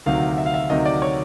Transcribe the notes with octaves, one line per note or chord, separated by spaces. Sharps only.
D2 C3 D#3 F#3 F5
E5
F5
E5
D2 C3 D#3 F#3 D#5
D5
C#5